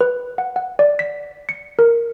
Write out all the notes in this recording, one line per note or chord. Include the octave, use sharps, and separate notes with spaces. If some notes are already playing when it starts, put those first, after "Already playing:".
B4
F#5
F#5
D5
B6
C#7
A#4